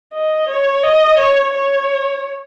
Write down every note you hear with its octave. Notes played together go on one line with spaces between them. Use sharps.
D#5
C#5
D#5
C#5
C#5